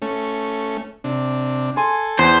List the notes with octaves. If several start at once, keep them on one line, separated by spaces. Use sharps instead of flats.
A3 C#4
C3 D4
A4 G#5 C6
E2 C5